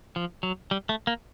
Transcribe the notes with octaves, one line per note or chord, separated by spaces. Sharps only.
F3
F#3
G3
A3
A#3